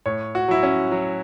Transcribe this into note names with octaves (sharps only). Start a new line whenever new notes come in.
A2 C#5
F#4
F#3 E4
C#4
F#3